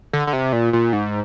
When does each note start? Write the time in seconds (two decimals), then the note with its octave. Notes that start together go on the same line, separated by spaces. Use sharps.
0.13 D3
0.27 D3
0.33 C3
0.53 A#2
0.73 A#2
0.93 G#2